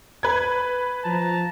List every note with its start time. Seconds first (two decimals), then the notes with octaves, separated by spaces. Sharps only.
0.23 B4 G#6
1.05 F3 A5 A#5